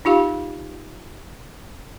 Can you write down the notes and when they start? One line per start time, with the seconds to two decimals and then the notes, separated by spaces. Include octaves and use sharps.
0.05 D#4 F4 G4 F5